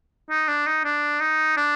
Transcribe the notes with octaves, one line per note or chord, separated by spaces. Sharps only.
D#4
D4
D#4
D4
D#4
D4